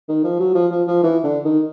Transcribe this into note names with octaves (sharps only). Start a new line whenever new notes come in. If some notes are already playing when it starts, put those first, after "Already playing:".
D#3
F3
F#3
F3
F3
F3
E3
D3
D#3